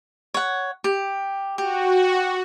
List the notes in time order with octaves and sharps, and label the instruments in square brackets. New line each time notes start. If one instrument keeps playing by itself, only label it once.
[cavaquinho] C#5 F#5
G4
[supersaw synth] F#4 [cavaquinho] G4